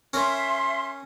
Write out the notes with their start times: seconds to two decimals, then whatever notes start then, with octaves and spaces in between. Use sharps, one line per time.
0.13 C#4 A#4 E5 C6